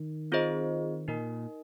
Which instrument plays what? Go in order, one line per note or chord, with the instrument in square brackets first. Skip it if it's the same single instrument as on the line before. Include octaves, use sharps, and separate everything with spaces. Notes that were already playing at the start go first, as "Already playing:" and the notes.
Already playing: [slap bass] D#3
[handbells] C4 F4 G#4 C5 D#5
[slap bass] A#2 [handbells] D#4 A#4 D#5